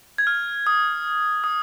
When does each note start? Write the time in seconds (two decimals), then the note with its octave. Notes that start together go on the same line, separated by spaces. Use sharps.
0.18 G#6
0.27 F6
0.67 D#6
1.44 D#6